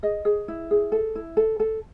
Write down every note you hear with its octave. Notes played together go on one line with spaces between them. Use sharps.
G#4 D#5
G#4
E4
G#4
A4
E4
A4
A4